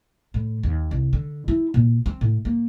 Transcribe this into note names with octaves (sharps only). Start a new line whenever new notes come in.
A2
D#2
C2
D3
E4
A#2
C4
A2
A#3